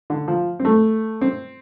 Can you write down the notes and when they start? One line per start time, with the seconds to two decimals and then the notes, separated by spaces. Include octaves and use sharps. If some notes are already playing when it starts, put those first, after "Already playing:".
0.10 D3
0.28 F3
0.60 C4
0.65 A3
1.21 C4